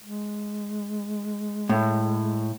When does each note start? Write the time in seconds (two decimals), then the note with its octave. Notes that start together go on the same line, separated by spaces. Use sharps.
0.03 G#3
1.69 A2